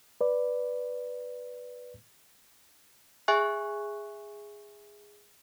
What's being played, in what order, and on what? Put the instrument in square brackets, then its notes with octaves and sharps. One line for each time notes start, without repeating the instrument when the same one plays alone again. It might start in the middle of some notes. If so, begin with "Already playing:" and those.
[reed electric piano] B4 D5
[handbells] G#4 E5 G#5 C#6 F#6